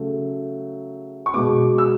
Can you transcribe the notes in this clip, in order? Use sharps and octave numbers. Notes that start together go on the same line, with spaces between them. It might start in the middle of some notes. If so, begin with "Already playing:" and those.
Already playing: C#3 F#3 A3
C#6
B2 G#3 B3 D6
E6